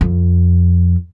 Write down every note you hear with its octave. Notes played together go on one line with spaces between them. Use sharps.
F2